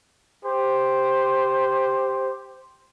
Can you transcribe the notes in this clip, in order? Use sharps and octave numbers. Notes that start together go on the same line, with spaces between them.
G4 C5